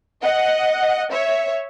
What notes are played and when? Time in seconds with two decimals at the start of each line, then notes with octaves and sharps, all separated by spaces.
0.22 D#5 F#5
1.10 C#5 E5